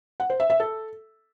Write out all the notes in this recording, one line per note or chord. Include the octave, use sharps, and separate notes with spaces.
F#5
C5
E5
E5
A4